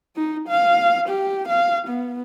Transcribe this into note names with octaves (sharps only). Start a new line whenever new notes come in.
D#4
F5
G4
F5
B3